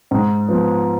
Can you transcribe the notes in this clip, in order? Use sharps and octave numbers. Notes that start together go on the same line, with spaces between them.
G#2
F3 B3